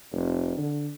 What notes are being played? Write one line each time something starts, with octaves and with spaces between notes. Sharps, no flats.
F1
D3